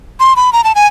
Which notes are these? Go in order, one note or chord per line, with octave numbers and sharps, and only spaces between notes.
C6
B5
A#5
A5
G#5